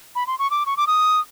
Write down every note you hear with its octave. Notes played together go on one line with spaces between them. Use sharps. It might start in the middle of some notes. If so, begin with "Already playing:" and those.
B5
C6
C#6
D6
C#6
D6
D#6